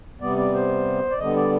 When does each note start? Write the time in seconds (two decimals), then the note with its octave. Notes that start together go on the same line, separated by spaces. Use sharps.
0.21 C3 G3 B3 D5
0.37 D5
0.54 C5
1.10 D5
1.19 D3 G3 B3 D#5
1.36 D5